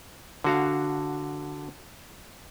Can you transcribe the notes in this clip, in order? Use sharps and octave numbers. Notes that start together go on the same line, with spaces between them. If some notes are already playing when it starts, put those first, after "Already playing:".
D3 F#4 F5